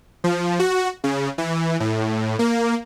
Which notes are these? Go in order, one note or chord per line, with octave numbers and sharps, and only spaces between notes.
F3
F#4
C#3
E3
A2
A#3